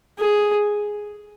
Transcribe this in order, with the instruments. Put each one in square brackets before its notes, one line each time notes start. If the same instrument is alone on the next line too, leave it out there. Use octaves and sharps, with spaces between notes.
[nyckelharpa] G#4